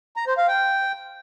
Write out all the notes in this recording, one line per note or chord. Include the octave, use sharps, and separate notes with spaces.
A#5
C5
F5
G5